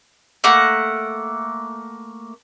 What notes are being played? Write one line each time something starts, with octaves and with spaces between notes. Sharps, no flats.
A3 A#3 F#5